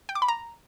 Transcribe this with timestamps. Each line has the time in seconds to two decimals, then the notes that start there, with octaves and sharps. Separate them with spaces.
0.09 G5
0.15 D6
0.22 B5
0.28 A#5